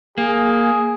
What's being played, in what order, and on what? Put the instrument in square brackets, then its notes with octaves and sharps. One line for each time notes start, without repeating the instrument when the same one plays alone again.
[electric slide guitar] A#3 [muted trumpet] G#4